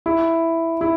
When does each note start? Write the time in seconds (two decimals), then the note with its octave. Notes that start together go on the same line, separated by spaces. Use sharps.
0.06 E4
0.81 E4